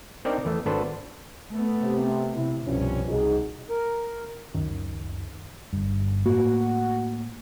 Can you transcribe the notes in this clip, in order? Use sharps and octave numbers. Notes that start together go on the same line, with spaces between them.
C4 D4 D#4 A#4 D5 G5
E2 E3 A3
G#1 B3 D4 A4 B4 C5
A3 B3
C3
C3 E4
C2 G2 B2 F3 C#4
C2 D#4 F#4 G#4
A#4
C#2 F#2 D#3
G1 G2
A2 A#3 F#4